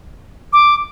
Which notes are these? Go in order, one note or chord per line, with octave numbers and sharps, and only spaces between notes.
D6